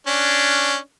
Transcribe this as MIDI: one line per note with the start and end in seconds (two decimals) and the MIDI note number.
0.07 0.77 61
0.07 0.77 62